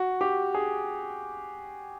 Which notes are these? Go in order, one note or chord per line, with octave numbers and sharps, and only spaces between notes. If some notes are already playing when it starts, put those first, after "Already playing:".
Already playing: F#4
G4
G#4